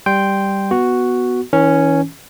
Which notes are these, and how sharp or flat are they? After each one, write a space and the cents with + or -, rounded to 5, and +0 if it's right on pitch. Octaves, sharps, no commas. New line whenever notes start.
G3 +0 G5 +0 C6 -5
B3 +0 F#4 +0
E3 -40 C#4 +0